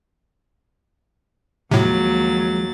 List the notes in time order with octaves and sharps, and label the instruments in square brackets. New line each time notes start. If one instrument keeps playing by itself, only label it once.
[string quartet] D#2 F#3 A6 [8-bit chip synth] A2 C3 [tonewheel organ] F3 G#3